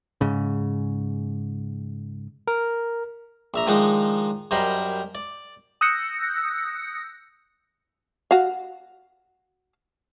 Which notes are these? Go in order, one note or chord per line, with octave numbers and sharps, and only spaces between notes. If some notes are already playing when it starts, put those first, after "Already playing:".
G#2 C#3
A#4
A#1 E5 A#5
D#3 F3 G#3 D4 D#4
F#2 G3 A#4 C5 D#5 B5
D5
D#6 E6 F#6 G6 A#6 C#7
F#4 F5